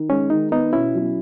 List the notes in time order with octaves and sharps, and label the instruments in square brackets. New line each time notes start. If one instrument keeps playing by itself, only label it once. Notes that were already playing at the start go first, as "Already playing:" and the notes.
Already playing: [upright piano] D#3
[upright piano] G#3 [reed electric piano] C#4
[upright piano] D#3 [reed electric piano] D#4
[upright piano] B3 [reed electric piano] D#4
[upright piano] B2 [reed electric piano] C#4 E4
[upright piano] F#3